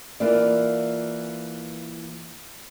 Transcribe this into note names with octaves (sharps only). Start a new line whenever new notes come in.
E3 A#3 F4 D5